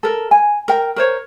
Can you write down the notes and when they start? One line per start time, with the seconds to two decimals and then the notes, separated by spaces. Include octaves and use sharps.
0.03 A4 A#4
0.31 G#5
0.68 A#4 G5
0.96 A#4 C5 C#5